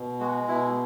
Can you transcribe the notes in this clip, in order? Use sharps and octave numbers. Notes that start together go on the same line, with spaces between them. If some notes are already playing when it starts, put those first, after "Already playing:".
Already playing: B2
G#3 F#4
B2 E4